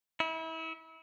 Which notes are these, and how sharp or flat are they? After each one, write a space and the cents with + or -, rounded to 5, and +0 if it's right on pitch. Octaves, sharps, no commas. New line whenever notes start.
E4 -30